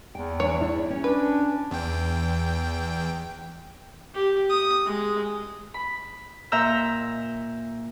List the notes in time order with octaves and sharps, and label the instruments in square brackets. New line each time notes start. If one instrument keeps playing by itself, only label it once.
[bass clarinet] E2 [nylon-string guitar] G5
[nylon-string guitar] E3 D4 [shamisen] C#5
[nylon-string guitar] E4 D5
C#4
[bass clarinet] D4 [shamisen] B4
[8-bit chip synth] E2 G5
[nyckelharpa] G4
D#6
G#3
[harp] B5
A#2 E5 A#5 E6 G6